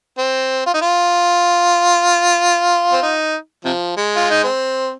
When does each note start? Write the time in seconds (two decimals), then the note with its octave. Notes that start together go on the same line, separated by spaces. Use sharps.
0.18 C4
0.66 F4
0.74 D#4
0.81 F4
2.92 C4
3.02 D#4
3.65 C3 F3
3.97 G#3
4.16 F4
4.30 D#4
4.44 C4